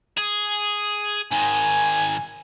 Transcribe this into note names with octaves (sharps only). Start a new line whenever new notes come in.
G#4
G#2 D#3 G#5